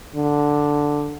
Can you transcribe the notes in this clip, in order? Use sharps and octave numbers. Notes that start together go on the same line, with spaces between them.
D3